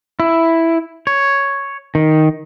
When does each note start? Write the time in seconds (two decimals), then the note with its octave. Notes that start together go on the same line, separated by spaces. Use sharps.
0.20 E4
1.07 C#5
1.95 D#3